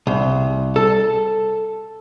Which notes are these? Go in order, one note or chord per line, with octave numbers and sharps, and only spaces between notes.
C2
A4